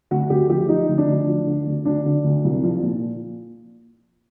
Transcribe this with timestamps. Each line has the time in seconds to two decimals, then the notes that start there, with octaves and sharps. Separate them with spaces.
0.11 D2 F#4
0.30 D2 G4
0.50 F3 G4
0.69 F3 D#4
0.89 D2
0.98 D4
1.08 D2
1.27 F3
1.47 D3
1.67 D2
1.85 D2 D4
2.05 D3
2.24 D2
2.45 C2
2.63 F3
2.83 A#2